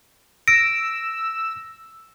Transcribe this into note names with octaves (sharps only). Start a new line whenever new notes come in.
E6 A#6 D7